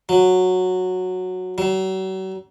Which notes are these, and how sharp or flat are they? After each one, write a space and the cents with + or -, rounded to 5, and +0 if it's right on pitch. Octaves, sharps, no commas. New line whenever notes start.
F#3 -10
F#3 +40